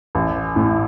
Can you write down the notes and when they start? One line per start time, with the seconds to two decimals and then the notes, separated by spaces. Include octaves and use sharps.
0.15 A1
0.56 A2